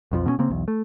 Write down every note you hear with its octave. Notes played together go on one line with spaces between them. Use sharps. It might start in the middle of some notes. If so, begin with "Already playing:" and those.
B1 F2 F3
B2 D#3 C#4
C#3 A#3 C4
B1 E2
A3